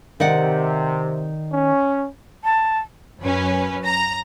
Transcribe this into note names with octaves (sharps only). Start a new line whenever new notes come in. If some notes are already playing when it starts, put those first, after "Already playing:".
C3 D#3 D5 F#5
C#4
A5
F#2 C#4 B4
A#5